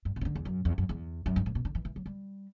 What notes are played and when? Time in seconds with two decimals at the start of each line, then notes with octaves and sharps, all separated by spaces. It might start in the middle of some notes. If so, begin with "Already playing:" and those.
0.05 G2
0.16 B2
0.21 C3
0.25 D3
0.35 E2
0.45 F#2
0.65 E2
0.78 F#2
0.89 E2
1.26 F#2
1.36 G2
1.46 A2
1.55 B2
1.65 D3
1.75 E3
1.85 E3
1.96 F#3
2.06 G3